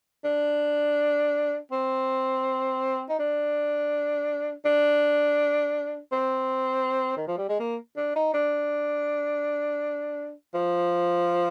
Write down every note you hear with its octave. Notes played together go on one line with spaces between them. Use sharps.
D4
C4
D#4
D4
D4
C4
D#3
F3
G3
G#3
A#3
D4
D#4
D4
F3